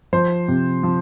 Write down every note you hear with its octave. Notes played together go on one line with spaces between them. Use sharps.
F3 C5
C3
F3